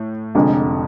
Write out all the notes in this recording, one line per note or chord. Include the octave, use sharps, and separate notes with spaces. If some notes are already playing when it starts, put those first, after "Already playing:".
Already playing: A2
F1 F2 D3 G#3